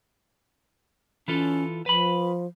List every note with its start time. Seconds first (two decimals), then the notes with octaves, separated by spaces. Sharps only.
1.28 E3 C#4 F4 A4
1.86 F3 B4 B5